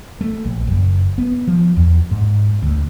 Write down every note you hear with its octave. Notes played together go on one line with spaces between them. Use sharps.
A3
A#1
F#1
B3
F3
E2
G#2
D2